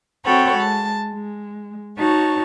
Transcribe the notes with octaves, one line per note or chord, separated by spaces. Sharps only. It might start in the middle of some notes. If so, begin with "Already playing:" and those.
C4 F#4 A4 C#5 G5 B5
G#3 A5
G#3
D#4 F#4 C#5 A5